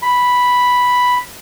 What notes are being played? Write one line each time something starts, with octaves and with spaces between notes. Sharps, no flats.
B5